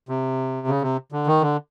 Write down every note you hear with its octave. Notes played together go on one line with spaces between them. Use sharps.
C3
C#3
C3
D3
D#3
D3